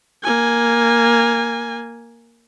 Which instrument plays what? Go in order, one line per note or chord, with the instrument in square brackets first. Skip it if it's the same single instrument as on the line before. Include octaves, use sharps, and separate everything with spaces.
[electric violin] A#3 G#5